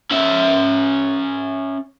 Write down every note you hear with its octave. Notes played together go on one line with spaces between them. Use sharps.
C#4 E5